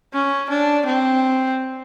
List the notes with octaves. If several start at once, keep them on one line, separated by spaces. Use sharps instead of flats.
C#4
D4
C4